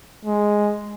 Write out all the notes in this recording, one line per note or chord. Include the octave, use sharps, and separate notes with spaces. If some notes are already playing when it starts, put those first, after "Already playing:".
G#3